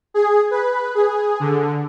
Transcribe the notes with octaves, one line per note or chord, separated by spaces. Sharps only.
G#4
B4
G#4
D3